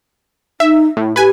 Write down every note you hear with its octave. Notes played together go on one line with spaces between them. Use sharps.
D#4 E5
A2 E4
G4 B4 G#5